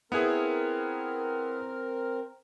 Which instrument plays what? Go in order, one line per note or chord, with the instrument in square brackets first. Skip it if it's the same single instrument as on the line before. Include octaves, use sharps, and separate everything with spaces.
[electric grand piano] B3 E4 G#4 [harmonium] C4 A#4